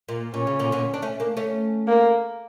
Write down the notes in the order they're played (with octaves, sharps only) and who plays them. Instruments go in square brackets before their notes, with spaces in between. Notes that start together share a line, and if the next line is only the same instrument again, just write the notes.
[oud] A#2
[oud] A#2 [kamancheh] C#4
[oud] C#3
A#2 D3
A#2 D3
D4
A3 C#4
A#3 D4
A3 C#4
[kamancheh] A#3